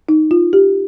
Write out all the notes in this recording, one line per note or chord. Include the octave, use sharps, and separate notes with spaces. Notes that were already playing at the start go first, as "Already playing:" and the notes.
D#4
F4
G4